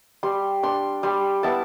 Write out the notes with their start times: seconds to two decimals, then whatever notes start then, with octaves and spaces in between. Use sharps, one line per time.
0.23 G3 C6
0.63 D4 C6
1.03 G3 C6
1.43 B3 E4 A5